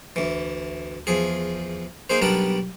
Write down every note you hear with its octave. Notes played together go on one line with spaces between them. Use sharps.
D2 E3
E2 F3 G#4
A#3 D#4 G#4 C5
B1 G3 B3 D4 A#4 A5